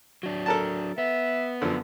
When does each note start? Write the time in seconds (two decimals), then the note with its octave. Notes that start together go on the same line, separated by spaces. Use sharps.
0.23 F#3 D4
0.46 A4 A#4 A5
0.98 B3 E5
1.61 F#2 D3 F3